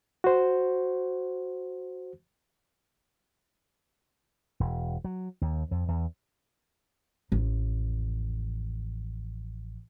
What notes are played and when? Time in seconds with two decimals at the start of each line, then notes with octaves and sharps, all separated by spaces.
0.24 F#4 C5
4.60 E1
5.04 F#3
5.41 D#2
5.71 F2
5.88 E2
7.32 A1 F2